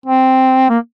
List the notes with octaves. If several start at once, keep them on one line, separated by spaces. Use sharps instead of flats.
C4
A#3